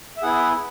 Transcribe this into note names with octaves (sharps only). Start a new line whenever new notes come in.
E5
B3 E4 G#4 F#5